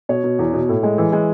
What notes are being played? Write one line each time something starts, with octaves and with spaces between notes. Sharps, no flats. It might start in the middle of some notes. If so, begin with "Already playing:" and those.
B2 C#5
B2
E2
B2
A2
G#3
E3
G#3